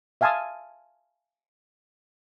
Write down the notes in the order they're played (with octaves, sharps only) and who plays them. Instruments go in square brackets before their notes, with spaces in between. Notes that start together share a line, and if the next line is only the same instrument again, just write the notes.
[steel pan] E5 F5 G#5 A5 C6 D#6